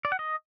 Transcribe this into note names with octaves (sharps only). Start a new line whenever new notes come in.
D5
F#5
D#5